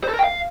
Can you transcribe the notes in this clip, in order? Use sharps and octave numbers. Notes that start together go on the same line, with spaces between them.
C5
A4
A#4
G5
F5